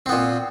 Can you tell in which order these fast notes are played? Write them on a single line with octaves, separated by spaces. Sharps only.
C4 B3 A#2